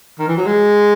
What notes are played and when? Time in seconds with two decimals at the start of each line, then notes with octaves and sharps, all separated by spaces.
0.19 D#3
0.28 E3
0.38 F#3
0.47 G#3